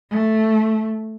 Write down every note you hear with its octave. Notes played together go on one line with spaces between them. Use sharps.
A3